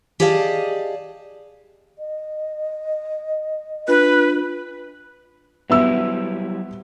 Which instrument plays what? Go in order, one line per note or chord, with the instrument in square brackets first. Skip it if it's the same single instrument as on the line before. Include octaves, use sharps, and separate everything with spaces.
[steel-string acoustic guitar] G4 G#4 D5 D#5 F5 A5
[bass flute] D#5
[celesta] D4 F4 F#6 [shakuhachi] B4
[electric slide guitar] F#3 G3 E4 [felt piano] B3 E5 E6